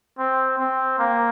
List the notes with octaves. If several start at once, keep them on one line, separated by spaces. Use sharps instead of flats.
C4
C4
A#3